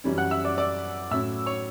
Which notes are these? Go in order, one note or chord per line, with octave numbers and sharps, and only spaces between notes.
F#2 E3 G3 C#4
F#5 F#6
E5 E6
D5 D6
D5 D6
A2 F#3 C#4 E5 E6
C#5 C#6